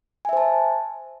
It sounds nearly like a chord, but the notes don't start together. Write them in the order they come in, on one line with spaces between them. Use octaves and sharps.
G#5 E5 C5 A5